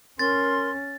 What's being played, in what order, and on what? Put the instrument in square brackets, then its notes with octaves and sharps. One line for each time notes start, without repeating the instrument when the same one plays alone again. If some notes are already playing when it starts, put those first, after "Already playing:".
[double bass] C#4 [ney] A#4 [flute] C6 [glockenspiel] A6